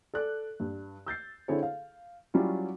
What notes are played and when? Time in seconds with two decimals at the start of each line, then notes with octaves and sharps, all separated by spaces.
0.14 A4 D5 F#6
0.60 G2
1.06 E6 G6 A6 C7
1.48 D3 C4 E4 G#4 A4 C#5
1.63 F5
2.34 F#3 G3 C#4 E4 F4